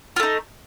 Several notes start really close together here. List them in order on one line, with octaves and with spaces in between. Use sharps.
F4 A3 D#4